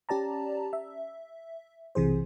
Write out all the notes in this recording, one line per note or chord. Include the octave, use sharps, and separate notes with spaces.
C#4 G4 D5 A5 A#5
E5
B1 C3 E3 G#4 C5